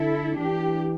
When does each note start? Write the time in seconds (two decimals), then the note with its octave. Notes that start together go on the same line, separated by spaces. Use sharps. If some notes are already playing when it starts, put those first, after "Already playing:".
Already playing: D3 E4 A4
0.37 E3 D4 G4